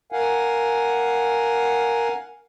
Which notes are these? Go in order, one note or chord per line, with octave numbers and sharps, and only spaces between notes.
A#4 F5 F#5 G#5